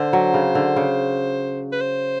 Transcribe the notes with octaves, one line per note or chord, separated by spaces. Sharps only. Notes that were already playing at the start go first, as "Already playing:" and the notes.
Already playing: D3 C5
F#3
C#3
D3
C#3
B4
C5